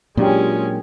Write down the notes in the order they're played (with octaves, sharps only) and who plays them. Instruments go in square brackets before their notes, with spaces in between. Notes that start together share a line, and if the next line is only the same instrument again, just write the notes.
[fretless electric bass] A#2 F#3 D4 [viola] G#3 C#4 [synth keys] F4 G4 G5